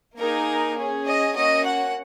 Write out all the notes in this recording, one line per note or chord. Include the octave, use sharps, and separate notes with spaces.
A#3 D#4 G#4 A#4
C#4 G#4
D#5
A#3 C#4 F#4 D#5
F#5